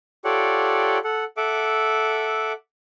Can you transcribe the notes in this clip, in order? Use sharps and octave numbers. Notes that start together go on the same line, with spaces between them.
F4 G4 A4 C#5 D5 F#5
A4 F#5
A4 E5 F#5 D6